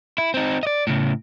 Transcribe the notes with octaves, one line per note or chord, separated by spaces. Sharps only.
E4
C4 D#4
D5 D#5
A2 C#3